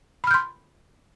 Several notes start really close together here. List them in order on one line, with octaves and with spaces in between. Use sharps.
B5 F6 G6 C6